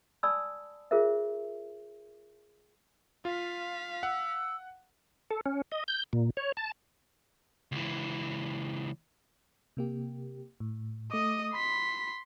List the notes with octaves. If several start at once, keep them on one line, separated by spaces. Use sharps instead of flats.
D5 G#5 A5 B5 D#6 E6
F4 G#4 A#4 C5 E5
F4 F5 B6
F#5 E6
A4
C#4
D#5
G6
A#2
C#5
A5
C#2 E3
C3 A#3 G4
A2
A3 D#5 D6 D#6
B5 C6 B6